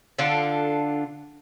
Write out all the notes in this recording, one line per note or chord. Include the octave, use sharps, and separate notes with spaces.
D3 D4 F4 A4